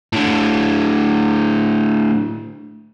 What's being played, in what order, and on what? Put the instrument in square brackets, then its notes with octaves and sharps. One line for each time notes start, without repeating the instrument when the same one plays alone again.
[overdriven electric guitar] A2 D3